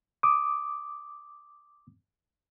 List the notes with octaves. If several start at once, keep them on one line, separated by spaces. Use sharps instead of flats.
D6 D#6